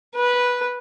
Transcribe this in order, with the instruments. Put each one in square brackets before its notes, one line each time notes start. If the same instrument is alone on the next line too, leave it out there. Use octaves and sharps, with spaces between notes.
[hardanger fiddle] B4